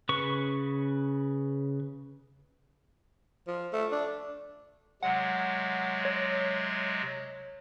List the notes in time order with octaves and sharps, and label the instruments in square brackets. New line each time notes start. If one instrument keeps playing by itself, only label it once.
[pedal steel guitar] C#3 B4 C#6
[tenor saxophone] F3
A3
D4
[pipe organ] C3 F#3 G#3 [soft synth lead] F#5
[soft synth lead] C#5